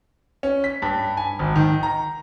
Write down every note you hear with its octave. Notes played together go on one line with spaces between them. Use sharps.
C#4
B6
G2
G#5
G#1
D#3
A#5